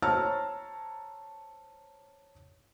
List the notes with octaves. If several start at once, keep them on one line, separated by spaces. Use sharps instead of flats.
C5 C#5 A5 A#5 E6 F6